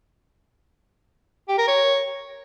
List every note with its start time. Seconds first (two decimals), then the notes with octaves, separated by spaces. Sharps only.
1.49 G4
1.58 A#4
1.68 C#5